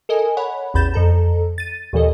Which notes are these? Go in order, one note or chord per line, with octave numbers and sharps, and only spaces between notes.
A4 A#4 D#5 G#5
C#5 F#5 B5
A1 E2 B5 G6 A6 E7
F2 A4 A#5
A6 D#7
D#2 A#2 E3 A4 D#5